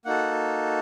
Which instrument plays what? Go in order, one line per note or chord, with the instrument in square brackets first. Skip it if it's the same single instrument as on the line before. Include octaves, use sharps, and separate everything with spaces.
[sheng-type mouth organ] A#3 D#4 F#4 A4 F#5